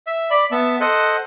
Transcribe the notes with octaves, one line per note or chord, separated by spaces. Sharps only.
E5
D5 B5
B3 E5 A5
A4 C5 D#5 F#5